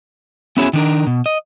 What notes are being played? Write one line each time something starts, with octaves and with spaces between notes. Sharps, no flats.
B3 C#4 E4 F#4 G#4 C#5
D#3 D4 A#4
B2
D#5